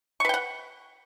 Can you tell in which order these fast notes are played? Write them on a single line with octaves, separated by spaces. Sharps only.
C#6 B4 G5 F#5